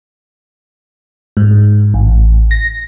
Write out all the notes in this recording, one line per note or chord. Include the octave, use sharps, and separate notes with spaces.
G#2
A1
A#6